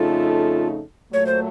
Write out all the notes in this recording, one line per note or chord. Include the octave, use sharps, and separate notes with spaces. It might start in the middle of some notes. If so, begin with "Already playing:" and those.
Already playing: F2 C#3 A3 D#4 F4 A4
A#2 F#3 A3 C#5
C5